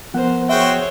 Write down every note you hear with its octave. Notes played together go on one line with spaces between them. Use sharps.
F3 B3 A#4 C5 F#5
F#4 G#4 C5 C#5 E5 G5